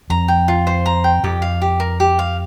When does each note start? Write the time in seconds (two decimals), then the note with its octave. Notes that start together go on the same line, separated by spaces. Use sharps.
0.10 F2 A#5
0.28 G5
0.48 F4
0.67 C5
0.86 A#5
1.04 G5
1.24 F2 G4
1.42 F5
1.62 G4
1.80 A#4
2.00 G4
2.19 F5